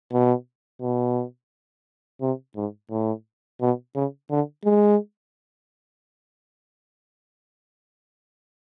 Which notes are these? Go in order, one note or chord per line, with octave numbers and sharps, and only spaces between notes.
B2
B2
C3
G#2
A2
B2
C#3
D3
G#3